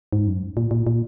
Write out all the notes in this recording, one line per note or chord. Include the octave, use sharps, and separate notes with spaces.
G#2
F#2
A#2
A#2
A#2